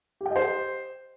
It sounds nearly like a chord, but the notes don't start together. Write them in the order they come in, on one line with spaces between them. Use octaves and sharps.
G4 G5 D#5 C5